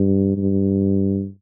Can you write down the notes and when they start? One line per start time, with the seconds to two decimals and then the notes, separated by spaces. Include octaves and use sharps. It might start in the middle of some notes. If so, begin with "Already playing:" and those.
Already playing: G2
0.37 G2